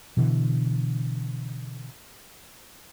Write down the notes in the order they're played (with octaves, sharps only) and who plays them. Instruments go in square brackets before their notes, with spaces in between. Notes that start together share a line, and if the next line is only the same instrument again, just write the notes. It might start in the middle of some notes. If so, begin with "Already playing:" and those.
[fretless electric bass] B2 D3 E3